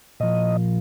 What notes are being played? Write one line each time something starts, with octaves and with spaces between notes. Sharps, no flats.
A#2 F3 D#5